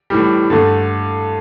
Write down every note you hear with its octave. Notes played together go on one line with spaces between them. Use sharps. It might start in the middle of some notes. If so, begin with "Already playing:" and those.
A2 E3 G3
G2 D3 A3